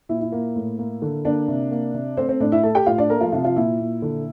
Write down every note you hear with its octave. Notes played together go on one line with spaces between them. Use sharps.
A#2 E4
E4
A#3
A2
A#3
D3
A#3 D4 D5
C3
A#3
C3
A3 C4 C5
C4 C5
A2 D4 D5
E4 E5
A3 A4 A5
G4 G5
A2 F4 F5
D4 D5
A3 A#3 A#4
F3 F4
C3 F3 F4
F3 F4
A#2 E4
A#2
D3